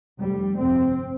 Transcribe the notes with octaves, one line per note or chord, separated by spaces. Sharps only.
F1 F2 C3 G3
G1 F2 C3 C4